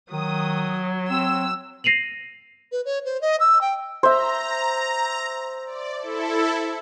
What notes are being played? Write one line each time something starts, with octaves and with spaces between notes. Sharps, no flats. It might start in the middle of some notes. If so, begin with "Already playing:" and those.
D#3 F#3 D#6
C4 E6
A#6 C7 D#7 F7 F#7
B4
C#5
C5
D#5
E6
G5
C5 E5 A#5
D5
E4 A4